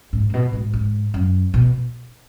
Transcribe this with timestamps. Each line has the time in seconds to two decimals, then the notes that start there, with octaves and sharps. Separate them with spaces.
0.13 G#2
0.30 G#2
0.34 B2
0.53 G#2
0.74 G#2
1.14 F#2
1.54 B2